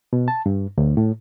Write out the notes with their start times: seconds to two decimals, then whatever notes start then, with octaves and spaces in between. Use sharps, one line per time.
0.13 B2
0.28 A5
0.46 G2
0.78 D2
0.97 A2